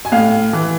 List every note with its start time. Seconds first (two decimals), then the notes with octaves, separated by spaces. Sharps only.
0.05 G#5
0.12 A2 F5
0.53 E3